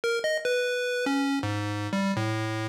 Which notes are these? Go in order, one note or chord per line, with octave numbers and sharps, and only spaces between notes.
A#4
D#5
B4
C#4
G#2
G3
A2